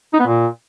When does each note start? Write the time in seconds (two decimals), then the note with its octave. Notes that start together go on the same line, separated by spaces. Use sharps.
0.13 D#4
0.20 B3
0.26 A#2